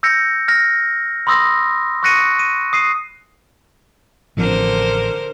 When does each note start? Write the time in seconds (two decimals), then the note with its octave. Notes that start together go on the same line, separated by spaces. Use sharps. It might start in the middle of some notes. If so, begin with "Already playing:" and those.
0.03 E6 G6 A#6 C#7
0.48 F6 A#6
1.27 B5 C6 D#6 E6 A#6
2.03 C#6 D#6 F#6 A#6 C#7 D#7
2.39 D#7
2.73 D#6 C7 D#7
4.37 A1 D3 F3 C4 A#4 C5